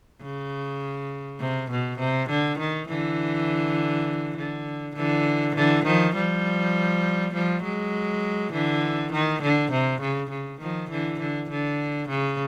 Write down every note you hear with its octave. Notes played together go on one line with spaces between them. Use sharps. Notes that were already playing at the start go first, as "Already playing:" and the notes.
C#3
C3
B2
C3
D3
D#3
D3 E3
D3
D3 E3
D3 E3
D#3 F3
F3 G3
F3 G3
F#3 G#3
D3 E3
D#3
D3
C3
C#3
C#3
D#3 F3
D3 E3
D3
D3
C#3